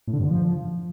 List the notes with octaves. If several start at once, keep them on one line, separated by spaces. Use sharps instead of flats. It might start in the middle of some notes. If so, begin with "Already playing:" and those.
A2
D3
G2
D3
F3